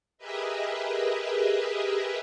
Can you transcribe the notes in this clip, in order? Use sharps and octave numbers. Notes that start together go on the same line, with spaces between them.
G4 G#4 A#4 B4 D#5 E5